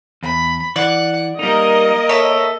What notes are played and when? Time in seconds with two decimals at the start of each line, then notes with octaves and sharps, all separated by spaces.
0.23 E2 B5
0.76 E3 D5 F#5
1.39 G3 A#3 D#4 A#4 D#5
2.09 A4 C#5 E5